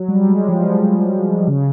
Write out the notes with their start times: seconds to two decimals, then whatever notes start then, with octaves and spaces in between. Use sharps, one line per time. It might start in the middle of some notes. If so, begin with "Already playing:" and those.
Already playing: F#3
0.08 G3
0.28 G#3
0.48 F3
1.48 C#3